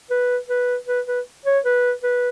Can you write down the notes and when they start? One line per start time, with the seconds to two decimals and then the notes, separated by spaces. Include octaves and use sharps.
0.10 B4
0.49 B4
0.87 B4
1.07 B4
1.46 C#5
1.65 B4
2.03 B4